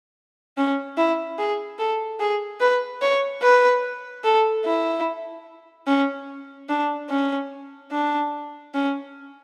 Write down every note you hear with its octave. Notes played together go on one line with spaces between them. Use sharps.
C#4
E4
G#4
A4
G#4
B4
C#5
B4
A4
E4
C#4
D4
C#4
D4
C#4